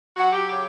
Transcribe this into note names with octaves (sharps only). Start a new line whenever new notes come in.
F#3 F#4
G4
C#3 G4